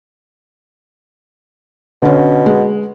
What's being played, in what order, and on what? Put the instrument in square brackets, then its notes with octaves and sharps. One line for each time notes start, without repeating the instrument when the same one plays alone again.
[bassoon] B2 [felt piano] D3 C#4
[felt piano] G#3